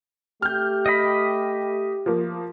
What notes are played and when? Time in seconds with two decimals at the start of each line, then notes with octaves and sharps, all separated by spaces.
0.42 A3 G4 F6 G6
0.86 D#5 G5 B5
2.06 F3 A#3